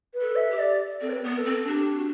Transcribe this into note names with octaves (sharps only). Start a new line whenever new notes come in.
B4
A4
E5
G4
D5
C4 A4
D5
B4
B3
A4
C4
D4 G4
F#4